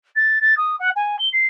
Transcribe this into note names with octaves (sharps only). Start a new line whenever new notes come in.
A6
A6
D#6
F#5
G#5
G7
C7